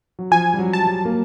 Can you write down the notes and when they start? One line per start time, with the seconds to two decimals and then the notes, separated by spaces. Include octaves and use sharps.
0.19 F#3
0.31 F3 G#5
0.54 G3
0.59 F#3
0.73 A5
0.87 G3
1.05 A#3